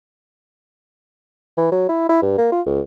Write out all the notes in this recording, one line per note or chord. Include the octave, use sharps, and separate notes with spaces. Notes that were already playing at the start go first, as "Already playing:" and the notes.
E3
F#3
E4
E4
G2
A#3
F4
C#2